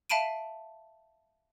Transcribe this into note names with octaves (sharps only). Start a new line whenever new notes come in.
E5 F5 A5 B5 D7 D#7